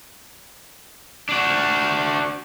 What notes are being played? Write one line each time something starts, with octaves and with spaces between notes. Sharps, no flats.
D4 F#4